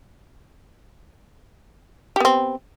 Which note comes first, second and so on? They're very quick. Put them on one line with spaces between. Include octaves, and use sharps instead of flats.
G4 B3 C4